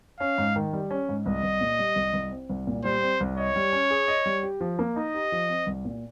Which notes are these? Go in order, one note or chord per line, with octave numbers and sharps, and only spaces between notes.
C#4 F5
G#2
D#3
G3
C#4
G#2
C2 D#5
C2
A#2
G3
C2
C2
C4
C2
A#2
G3 C5
C4
C2
C#5 D#5
G3
C#4
G#4
D#5
G3
G4
F3
A#3
D#4 D#5
G4
F3
C4
C2
A#2